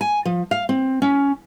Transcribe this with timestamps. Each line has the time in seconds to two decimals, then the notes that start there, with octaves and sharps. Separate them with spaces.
0.01 G#5
0.25 F3
0.51 F5
0.69 C4
1.02 C#4